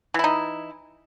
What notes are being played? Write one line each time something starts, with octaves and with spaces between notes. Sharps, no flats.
E3 D#4 E4